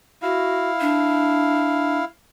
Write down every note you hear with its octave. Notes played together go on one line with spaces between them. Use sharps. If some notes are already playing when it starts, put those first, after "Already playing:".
E4 F#4 F5
D4